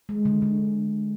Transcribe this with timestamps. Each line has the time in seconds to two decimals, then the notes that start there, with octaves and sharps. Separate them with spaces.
0.09 G#3
0.25 D3
0.42 D3